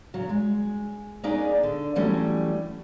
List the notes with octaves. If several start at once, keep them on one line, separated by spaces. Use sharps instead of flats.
C#3 F#3
G#3
A#3 C#4 D#4 G#4 B4 D5
D3
E3 F#3 G3 A3 C#4